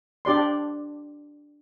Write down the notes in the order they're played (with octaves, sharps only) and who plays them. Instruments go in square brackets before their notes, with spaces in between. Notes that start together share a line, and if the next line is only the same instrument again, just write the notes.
[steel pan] D4 G4 D5 C6